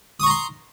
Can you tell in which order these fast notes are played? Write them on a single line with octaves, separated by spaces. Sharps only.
D#6 C#6 A#5 C6